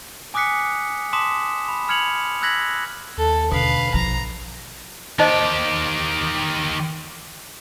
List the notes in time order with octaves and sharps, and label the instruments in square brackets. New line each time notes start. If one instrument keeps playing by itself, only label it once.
[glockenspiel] G#5 D6 D#6 F#6 B6 C#7
A5 C6 D6 D#6 B6 E7
B5
B5 F6 G#6 C#7 F7 F#7
E6 F#6 G#6 A#6 B6 F#7
[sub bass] D#2 [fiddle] A4
[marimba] B2 [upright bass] D3 [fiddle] B4 F5
[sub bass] A#1 [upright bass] F3 [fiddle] A#5
[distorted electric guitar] D#3 G4 [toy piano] D#4 C5 D#5